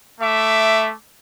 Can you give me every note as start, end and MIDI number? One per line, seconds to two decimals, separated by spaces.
0.21 0.93 57
0.21 0.93 76
0.21 0.93 86